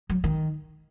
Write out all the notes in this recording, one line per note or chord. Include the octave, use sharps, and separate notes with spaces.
F#3
D#3